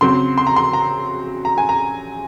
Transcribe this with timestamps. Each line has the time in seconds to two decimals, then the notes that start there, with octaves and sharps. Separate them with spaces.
0.01 C#3 F#3 C4 C6
0.38 C6
0.47 A#5
0.56 C6
0.73 A#5
1.45 A#5
1.58 G#5
1.69 A#5